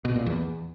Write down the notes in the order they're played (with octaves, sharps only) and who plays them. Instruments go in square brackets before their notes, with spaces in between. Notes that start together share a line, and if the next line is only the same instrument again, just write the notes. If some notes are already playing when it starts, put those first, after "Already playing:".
[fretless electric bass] B2
A#2
E2